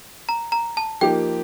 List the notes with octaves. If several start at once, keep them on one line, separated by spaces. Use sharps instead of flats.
A#5
A#5
A5
F3 A#3 D#4 G4 G5